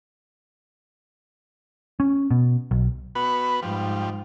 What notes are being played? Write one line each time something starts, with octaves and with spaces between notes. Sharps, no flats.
C#4
B2
B1
B3 F#4 B4
G#2 F3 G3